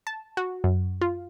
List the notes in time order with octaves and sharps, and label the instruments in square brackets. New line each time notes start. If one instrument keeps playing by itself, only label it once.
[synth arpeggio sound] A5
F#4
F#2
F4